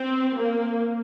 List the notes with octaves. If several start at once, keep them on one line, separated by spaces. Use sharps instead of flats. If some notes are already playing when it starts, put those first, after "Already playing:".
Already playing: C4
A#3